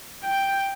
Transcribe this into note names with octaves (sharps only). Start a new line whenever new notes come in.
G5